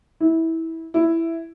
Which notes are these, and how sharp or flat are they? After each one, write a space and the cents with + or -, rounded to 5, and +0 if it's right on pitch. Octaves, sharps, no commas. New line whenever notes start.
E4 -20
E4 +5